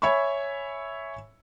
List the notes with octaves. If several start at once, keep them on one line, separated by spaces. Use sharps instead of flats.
C#5 E5 G#5 B5 C#6